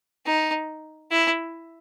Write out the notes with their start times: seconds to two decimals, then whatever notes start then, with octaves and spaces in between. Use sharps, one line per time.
0.26 D#4
1.11 E4